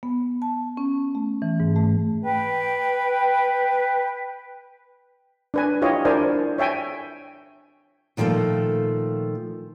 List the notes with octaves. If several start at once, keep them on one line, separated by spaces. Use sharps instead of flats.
B3
A5
C#4
A3
E3
G#2
A3
B4 G5
D4 B4 G#5
E4 F4 G4 C#5 D#5
D4 E4 A#4 C5 D5 G#5
C#5 E5 G5 G#5
A#2 D#3 F3 G3 A3